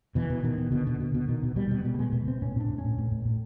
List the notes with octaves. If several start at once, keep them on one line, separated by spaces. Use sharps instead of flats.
B2 E3
B2
B2 D#3
B2
B2 D3
B2
B2
B2
B2 D#3
B2
B2 G3
B2
B2 G3
A3
B2 G#3
B2 B3
B2 C4
A2 C#4
A2 D4
A2
C#4
A2
A2
A2
A2